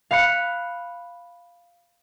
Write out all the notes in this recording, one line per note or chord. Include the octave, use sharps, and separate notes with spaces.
F5 B5 F#6 C#7